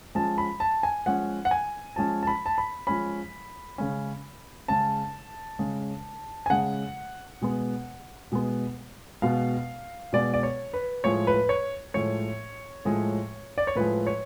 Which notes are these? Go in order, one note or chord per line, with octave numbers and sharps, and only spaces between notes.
F3 G#3 C#4 A5
B5
A5
G#5
F3 G#3 C#4 F#5
F#5
G#5
F3 G#3 C#4 A5
A5
B5
A5
B5
F3 G#3 C#4 B5
C#3 G#3 C#4
C#3 G#3 C#4 A5
C#3 G#3 C#4
G#5
C#3 G#3 C#4 F#5
B2 G#3 B3
B2 G#3 B3
B2 G#3 B3 F5
B2 G#3 B3 D5
D5
C#5
B4
A2 F3 G#3 C#5
B4
C#5
A2 F3 G#3 C#5
A2 F3 G#3
D5
C#5
A2 F3 G#3 B4
C#5